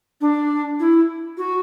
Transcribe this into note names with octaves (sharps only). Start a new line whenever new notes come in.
D4
E4
F#4